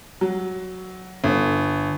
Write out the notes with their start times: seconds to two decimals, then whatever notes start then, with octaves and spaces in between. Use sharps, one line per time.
0.21 F#3
1.24 G1